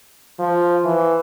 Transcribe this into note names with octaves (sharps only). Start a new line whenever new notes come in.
F3
E3